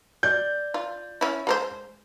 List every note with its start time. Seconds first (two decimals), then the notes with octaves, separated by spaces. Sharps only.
0.23 D5 G6
0.74 F4
1.21 C#4 E4
1.47 G#3 A#4 C5